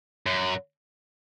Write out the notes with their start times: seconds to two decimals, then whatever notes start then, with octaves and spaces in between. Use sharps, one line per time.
0.26 F#2